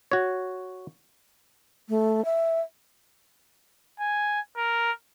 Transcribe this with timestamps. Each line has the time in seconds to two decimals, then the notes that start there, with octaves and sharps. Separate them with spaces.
0.12 F#4 C#5
1.89 A3
2.25 E5
4.00 G#5
4.57 A#4